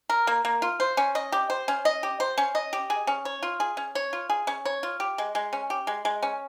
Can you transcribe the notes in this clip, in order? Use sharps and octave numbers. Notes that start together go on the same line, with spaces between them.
A#4
A#3
A#3
F4
C5
C#4
D#5
G4
C5
C#4
D#5
G4
C5
C#4
D#5
G4
G#4
C#4
C#5
F4
G#4
C#4
C#5
F4
G#4
C#4
C#5
F4
G4
G#3
G#3
C#4
G4
G#3
G#3
C#4